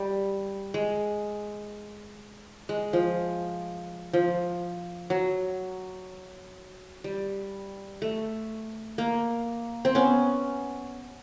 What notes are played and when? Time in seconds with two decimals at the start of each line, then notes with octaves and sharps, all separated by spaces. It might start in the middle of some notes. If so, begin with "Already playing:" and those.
Already playing: G3
0.74 G#3
2.69 G#3
2.93 F3
4.13 F3
5.10 F#3
7.04 G3
8.02 A3
8.98 A#3
9.85 C4
9.95 B3 C#4